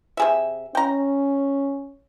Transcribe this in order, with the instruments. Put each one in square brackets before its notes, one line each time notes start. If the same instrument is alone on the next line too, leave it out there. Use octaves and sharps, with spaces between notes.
[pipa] C3 G#4 E5
[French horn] C#4 [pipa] G5 A#5